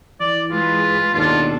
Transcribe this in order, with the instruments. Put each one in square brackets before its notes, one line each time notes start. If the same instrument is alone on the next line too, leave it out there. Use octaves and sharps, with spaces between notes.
[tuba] E3 [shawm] D5
[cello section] G#3 G#4 B4 [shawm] F4
[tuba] D#2 [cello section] B2 D4 A4 [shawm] F4